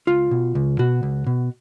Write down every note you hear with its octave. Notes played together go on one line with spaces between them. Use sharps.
C#2 F4
B2
C#2
B2 F#4
C#2
B2